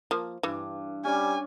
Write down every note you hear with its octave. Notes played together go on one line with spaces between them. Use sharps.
F3 A#3
G2 E3
G3 C#4 D5 G#5